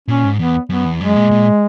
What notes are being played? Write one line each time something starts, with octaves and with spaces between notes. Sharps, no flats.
A#2 C#4
G#2
E2 B3
F#2 B3
E2
F#2 G#3
A#2
A#2